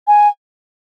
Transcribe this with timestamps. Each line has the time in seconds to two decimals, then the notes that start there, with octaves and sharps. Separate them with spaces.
0.08 G#5